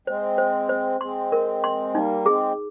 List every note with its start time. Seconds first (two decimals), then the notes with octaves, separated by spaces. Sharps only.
0.07 G#3 C4 C5
0.38 C5
0.69 C5
1.01 G#3 C4 C6
1.32 A#4
1.64 C6
1.94 G3 A#3 D#4
2.25 G#3 C4 G#4